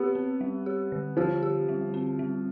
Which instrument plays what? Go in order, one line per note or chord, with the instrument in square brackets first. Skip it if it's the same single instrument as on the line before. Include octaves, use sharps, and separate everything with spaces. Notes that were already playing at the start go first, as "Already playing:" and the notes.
Already playing: [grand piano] B3 [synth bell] C4 G4
[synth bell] C4
G3
G4
D3
[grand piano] F3 [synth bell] G4
[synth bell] G4
G3
C4
G3